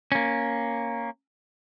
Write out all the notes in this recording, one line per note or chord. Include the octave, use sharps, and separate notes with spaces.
A#3 C#4